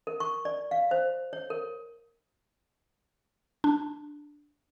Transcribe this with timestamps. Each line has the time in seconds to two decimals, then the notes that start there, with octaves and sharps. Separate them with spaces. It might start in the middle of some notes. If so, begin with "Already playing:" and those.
0.07 A#4
0.20 C#6
0.45 D5
0.71 F5
0.91 C5
1.33 C#5
1.50 A#4
3.64 D4